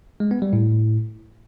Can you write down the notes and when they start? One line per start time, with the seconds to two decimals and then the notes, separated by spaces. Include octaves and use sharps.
0.20 G#3
0.31 B3
0.42 G3
0.53 A2